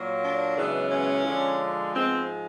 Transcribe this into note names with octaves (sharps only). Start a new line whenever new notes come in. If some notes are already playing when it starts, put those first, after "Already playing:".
Already playing: A#2 F#3 A#3
D4
F#2 C#3 E3 G#3 B3
C#4
D3 F3 G#3
G#2 F3 G#3 B3 C4